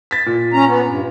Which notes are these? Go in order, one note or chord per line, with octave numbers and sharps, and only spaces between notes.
A6 B6
A#2
C#4 A#5
B3
G2